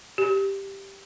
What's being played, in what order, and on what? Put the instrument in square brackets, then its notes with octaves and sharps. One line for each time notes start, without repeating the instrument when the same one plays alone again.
[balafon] G4